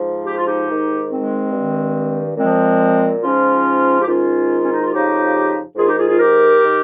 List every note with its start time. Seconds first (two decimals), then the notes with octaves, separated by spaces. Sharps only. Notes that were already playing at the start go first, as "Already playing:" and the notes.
Already playing: G#2 F3
0.25 G4
0.35 F4
0.45 D#4 G4
0.67 G#2 D#3
1.10 G#3 C4
1.52 G2 D#3
2.37 A#2 F3 G#3 C4
3.22 G#2 F3 C#4 F4
4.00 G4
4.06 G#2 D#3 C#4 F4
4.61 C#4
4.71 D#4
4.82 F4
4.91 F2 C#3 F3 D#4 G4
5.76 G#2 D#3 F4 G#4
5.87 D#4 G4
5.97 F4 G#4
6.08 F4 G#4
6.19 G4 A#4
6.62 D#3